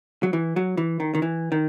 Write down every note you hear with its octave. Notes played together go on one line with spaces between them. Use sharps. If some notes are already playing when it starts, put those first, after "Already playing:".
F#3
E3
F#3
E3
D#3
D#3
E3
D#3